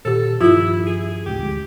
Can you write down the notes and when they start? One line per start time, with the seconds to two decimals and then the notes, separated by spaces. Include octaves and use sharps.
0.05 A#2 D#3 G4 A4
0.41 G2 F3 E4 F4
0.87 G#4
1.26 D#1 A1 G#2 G4
1.38 D2 G#3